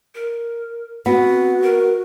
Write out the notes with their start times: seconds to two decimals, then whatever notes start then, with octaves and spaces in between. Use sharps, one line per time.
0.15 A#4
1.06 B3 C4 F#4
1.63 A#4